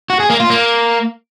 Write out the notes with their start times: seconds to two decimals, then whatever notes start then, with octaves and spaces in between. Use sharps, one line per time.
0.10 F#4
0.20 G#4
0.30 A#3
0.40 F4
0.50 A#3